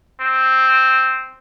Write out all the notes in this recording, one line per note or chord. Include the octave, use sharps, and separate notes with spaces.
C4